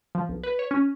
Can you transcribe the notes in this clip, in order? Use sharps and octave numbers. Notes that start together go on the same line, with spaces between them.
F3
B1
B4
C#5
C#4